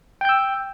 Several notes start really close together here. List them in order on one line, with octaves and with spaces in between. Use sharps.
G5 G6 E6